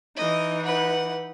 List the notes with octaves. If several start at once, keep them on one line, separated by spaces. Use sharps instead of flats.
E3 D#4 D#5
B4 F#5